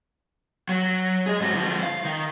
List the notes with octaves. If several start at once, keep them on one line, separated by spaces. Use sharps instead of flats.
F#3
G#4 D#5
G#2 F#4
D3 F3
F5
D#3